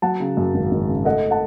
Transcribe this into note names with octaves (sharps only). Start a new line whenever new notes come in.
F#3 F#5 A5
C#3
F#2
G#1
G#1
C#3
A3 D#5 F#5
F#5 A5